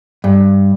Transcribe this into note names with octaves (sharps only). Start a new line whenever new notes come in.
G2